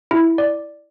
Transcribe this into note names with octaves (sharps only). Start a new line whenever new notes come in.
E4
D5